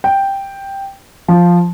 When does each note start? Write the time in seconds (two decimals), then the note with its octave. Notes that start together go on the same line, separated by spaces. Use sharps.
0.04 G5
1.28 F3